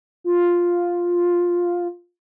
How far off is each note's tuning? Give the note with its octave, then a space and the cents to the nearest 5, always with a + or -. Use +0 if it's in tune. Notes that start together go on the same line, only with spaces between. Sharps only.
F4 +5